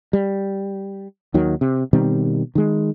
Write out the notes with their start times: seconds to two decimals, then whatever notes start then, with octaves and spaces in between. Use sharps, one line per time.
0.13 G3
1.34 D#2 D#3 F#3
1.61 C3
1.93 B2 D#3 G3 C4
2.55 D#3 G#3